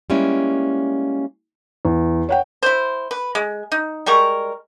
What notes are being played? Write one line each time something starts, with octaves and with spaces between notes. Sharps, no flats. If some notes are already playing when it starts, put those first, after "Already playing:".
G3 G#3 A#3 C#4 E4
E2
C#5 F#5 G5
E4 C5
B4
G#3
D#4
G3 G#3 A#4 C#6